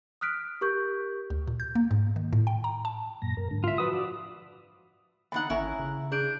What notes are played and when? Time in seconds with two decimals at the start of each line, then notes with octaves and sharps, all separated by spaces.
0.21 D#6 F6 F#6 B6 D7
0.61 G4 A#4 C#6 G6
1.30 D2
1.48 A#2
1.60 G6
1.75 A#3
1.91 G#2
2.16 D#3
2.33 A2
2.47 G5
2.64 A#5
2.85 A5
3.22 F#2 A#2 A#6
3.37 F#2 A#4
3.51 G#2 D3
3.64 F4 E5
3.78 F3 F#4 B4 D#6 E6
3.93 D5
5.32 E2 D3 D#4 F#5 B5
5.50 G#1 C#4 E4 E5 A#5
5.79 C#3
6.12 D4 G#4 G6 D7